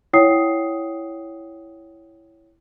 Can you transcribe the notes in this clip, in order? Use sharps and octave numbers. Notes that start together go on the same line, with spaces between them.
E4 C#5 F#5 G5 D#6 C7